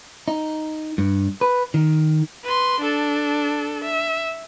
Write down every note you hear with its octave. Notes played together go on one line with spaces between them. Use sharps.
D#4
G2
B4
D#3
B4 C6
D4 A4
E5